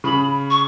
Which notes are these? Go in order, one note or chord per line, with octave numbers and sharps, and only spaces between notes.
C#3 B5
C#6